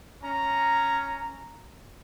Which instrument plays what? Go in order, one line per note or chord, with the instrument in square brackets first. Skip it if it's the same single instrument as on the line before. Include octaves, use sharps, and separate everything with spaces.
[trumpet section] C#4 A#5